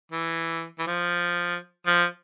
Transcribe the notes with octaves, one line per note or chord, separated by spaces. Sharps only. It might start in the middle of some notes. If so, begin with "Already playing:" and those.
E3
E3
F3
F3